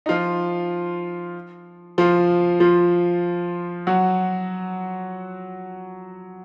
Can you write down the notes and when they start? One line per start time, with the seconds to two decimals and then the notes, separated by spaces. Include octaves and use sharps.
0.06 D#4
0.09 F3 F4
1.98 F3 F4
2.60 F3 F4
3.87 F#3 F#4